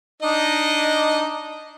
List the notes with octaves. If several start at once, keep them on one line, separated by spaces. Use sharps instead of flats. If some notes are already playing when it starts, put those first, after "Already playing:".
D4 D#4 D#5